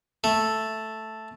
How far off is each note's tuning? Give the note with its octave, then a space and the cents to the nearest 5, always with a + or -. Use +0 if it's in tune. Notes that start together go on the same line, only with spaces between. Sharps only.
A3 +0